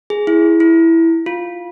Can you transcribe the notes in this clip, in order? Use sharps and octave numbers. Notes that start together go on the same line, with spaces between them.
G#4
E4
E4
F4